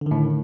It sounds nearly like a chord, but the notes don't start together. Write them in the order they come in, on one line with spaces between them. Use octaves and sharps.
D3 D#3 A2